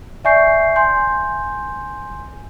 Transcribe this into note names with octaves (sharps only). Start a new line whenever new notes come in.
D5 E5 G#5 C#6 G6 C7
G#5 C6 G6